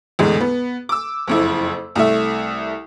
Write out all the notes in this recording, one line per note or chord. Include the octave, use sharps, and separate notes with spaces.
E2 A2 D3 G#3
B3
D6 E6
F#1 F2 E4
C2 A3 E5